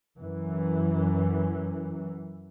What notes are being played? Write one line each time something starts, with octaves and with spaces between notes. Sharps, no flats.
F#2 E3